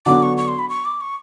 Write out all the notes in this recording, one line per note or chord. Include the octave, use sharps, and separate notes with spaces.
D3 F#3 B3 D4 F#4 D6
C#6
C#6
C6
B5
C#6
D6
C#6